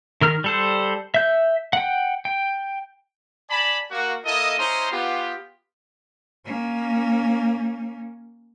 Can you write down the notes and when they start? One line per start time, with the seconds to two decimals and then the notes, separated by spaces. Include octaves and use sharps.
0.21 D#3 A#4 F6
0.44 G3 A4 C5
1.14 E5 G6
1.73 F#5 G5
2.25 G5
3.50 D5 G#5 A5 B5
3.91 A#3 F#4
4.25 A#3 E4 A4 D#5
4.58 C#4 E4 C5 D#5 A#5 C6
4.91 B3 F4 G4
6.45 A#3 C#4